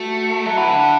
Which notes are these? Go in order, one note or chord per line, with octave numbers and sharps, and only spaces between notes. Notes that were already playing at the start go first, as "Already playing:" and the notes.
Already playing: A3 F#4
F#3 E5 A5
E3 F#5 B5
D3 E5 A5